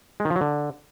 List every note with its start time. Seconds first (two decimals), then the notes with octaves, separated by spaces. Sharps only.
0.20 G#3
0.25 D#3
0.30 F3
0.36 F#3
0.41 D3